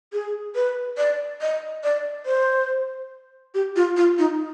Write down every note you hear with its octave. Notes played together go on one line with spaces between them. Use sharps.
G#4
B4
D5
D#5
D5
C5
G4
F4
F4
D#4